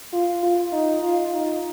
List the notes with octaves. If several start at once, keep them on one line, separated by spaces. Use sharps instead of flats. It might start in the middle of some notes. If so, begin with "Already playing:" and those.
F4
F4
D#4
F4
D#4